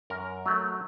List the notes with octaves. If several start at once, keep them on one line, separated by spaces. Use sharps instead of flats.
F#2 A#4
F#3 A3